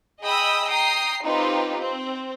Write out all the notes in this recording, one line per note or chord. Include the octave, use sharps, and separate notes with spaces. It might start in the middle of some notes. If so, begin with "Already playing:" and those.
G#4 D#5 G5 B5 D#6 E6
G5 A#5 D#6 C7
C4 D#4 F4 G4 B4
C4